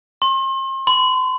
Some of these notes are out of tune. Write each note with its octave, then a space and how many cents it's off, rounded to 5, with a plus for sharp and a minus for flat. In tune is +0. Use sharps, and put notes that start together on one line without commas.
C6 +40
C6 -45